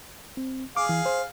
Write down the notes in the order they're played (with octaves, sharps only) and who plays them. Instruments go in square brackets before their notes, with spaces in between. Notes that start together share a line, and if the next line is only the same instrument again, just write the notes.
[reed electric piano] C4
[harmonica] G#4 F5 [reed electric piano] D6
[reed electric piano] E3
C5